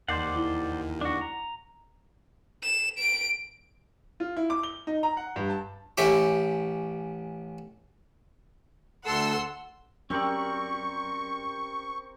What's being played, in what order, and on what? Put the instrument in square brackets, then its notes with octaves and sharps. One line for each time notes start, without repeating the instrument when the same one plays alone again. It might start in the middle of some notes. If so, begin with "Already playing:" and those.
[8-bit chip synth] D#2 [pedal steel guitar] C5 D5 F#5 [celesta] C6 G6 C7
[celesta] E4
[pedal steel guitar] D4 F#4
A#5
[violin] E7
D7
[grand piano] F4
E4
D6
G7
D#4
A#5
F#5
G2
A5
[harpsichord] A1 C#4 G4 E5 D6
[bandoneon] D2 A4 [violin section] F#5 C6 E6
[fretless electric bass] F#2 [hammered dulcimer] C4 G4 A#4 [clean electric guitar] C#4 D5 [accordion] C#6